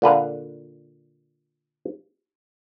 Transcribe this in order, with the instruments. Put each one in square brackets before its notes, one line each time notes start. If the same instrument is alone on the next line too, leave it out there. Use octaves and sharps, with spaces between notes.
[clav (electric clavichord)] A#2 D3 B4 F5